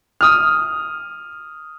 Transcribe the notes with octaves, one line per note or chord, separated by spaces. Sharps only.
D#6 F6